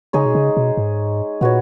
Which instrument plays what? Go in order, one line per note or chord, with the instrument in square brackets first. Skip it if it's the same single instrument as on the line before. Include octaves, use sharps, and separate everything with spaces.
[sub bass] C#3 [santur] G#3 D#4 G#4 C#5
[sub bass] B2
C#3
B2
G#2
[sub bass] A#2 [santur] B3 F#4 C#5